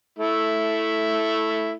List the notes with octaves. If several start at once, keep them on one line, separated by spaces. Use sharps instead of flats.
A3 E4